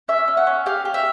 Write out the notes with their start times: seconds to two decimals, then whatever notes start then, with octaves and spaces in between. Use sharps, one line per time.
0.08 C#4 E5
0.28 C#4
0.37 F#5
0.47 C#4
0.66 G4 F5
0.85 G4
0.94 E5